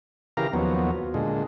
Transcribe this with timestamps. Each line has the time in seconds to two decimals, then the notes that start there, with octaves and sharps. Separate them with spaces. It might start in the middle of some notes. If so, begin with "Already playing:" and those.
0.37 C#3 E3 G4 A#4 F5 A#5
0.53 D#2 F3 F#3 B3
1.14 A#2 D3 G#3